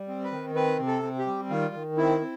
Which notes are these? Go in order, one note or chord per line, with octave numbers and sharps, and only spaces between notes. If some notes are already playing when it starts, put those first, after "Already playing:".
Already playing: G3
C4
B4
D#3
C4 B4
C3
A4
C4
G4
G3
D#3 F4
D#3
C4 E4
C4